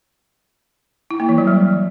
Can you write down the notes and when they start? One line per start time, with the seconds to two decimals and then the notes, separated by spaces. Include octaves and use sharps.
1.11 E4
1.20 A#3
1.29 E3
1.38 F#3
1.47 G3